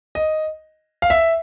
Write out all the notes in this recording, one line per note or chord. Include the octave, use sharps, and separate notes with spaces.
D#5
F5
E5